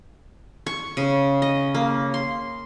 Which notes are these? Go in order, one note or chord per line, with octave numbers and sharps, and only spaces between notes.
C#6
C#3
D#5
A#3
C6